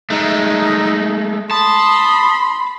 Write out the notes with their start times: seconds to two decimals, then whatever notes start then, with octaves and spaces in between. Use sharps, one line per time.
0.10 G#3 A3 D#4
1.51 A5 B5 C6 D#6